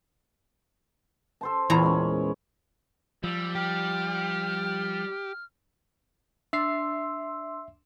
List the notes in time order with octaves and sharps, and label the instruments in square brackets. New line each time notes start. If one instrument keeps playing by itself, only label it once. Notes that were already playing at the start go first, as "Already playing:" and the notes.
[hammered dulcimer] A4 C5 A5
[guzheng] E2 A#2 A#5 [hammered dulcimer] C#5 B5 C#6
[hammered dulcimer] G#3 C#4
[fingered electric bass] F3 [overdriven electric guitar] G3 [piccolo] E6
[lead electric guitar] G4 [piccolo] F6
[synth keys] D4 [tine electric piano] E5 C7 [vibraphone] C6 E6